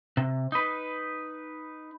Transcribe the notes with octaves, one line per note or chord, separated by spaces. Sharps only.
C3
D#4 B4